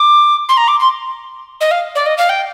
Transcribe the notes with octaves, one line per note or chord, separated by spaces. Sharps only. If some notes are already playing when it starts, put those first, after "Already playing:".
Already playing: D6
C6
A#5
D6
C6
D#5
F5
D5
D#5
F5
G5